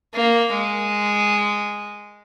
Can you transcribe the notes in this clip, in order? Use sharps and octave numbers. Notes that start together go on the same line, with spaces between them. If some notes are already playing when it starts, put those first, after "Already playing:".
A#3
G#3